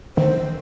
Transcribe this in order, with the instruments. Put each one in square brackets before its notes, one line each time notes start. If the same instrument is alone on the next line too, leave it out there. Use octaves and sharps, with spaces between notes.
[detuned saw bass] D#3 [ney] C5